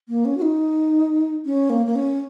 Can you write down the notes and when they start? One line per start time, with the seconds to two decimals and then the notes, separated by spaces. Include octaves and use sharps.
0.09 A#3
0.25 C#4
0.37 F#4
0.42 D#4
1.45 C#4
1.70 A#3
1.86 A#3
1.96 C#4